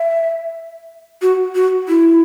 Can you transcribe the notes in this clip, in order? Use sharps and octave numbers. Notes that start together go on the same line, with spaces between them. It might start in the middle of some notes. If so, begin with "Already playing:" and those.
Already playing: E5
F#4
F#4
E4